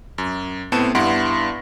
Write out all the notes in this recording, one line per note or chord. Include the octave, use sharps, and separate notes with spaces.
F#2
A2 B3 C4 A5 E7
G2 B3 E4 F#5 C6 D7